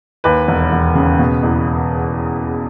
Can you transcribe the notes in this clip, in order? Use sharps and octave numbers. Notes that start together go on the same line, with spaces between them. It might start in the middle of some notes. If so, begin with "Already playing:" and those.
D#2 B4
E1
E1
C#3
B2
E2